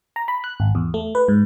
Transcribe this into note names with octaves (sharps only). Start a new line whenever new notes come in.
A#5
B5
F#6
G#1
E2
A3
B4
G#2